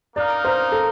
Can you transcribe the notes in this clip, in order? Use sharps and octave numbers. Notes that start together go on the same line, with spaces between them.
A#3 D#4 A#4 D5 F5
C5
A4